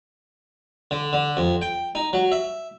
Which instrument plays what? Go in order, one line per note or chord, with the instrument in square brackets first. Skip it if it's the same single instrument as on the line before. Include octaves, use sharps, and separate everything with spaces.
[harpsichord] D3
D3
F2
G5
D#4
F#3
E5